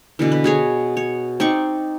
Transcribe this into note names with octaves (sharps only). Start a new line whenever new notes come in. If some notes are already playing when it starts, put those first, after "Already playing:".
B2 D3 E3
B4
F#4 G#4 C#5
C#5
C4 D#4 D5 C#6